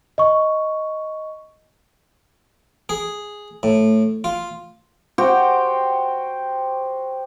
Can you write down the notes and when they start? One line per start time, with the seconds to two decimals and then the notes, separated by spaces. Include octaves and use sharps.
0.18 D#5 C#6
2.89 G#4
3.63 A2
4.24 F4
5.18 F#4 G4 C5 G5